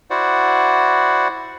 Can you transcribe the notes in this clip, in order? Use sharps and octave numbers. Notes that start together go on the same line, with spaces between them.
E4 F#4 C5 D5 F#5